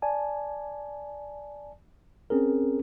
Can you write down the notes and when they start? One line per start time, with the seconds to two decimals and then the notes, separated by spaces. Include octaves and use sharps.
0.02 D5 G#5 A5
2.30 C4 C#4 G#4 A#4